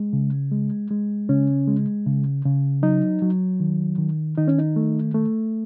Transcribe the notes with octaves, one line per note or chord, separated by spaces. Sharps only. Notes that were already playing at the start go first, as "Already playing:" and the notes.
Already playing: G#3
C#3
G#3
G#3
C#3 C#4
G#3
C#3
C#3
F#3 D#4
F#3
D#3
D#3
D#3 D#4
C#4
D#4
A3
A3